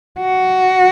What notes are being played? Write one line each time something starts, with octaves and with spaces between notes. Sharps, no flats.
F#4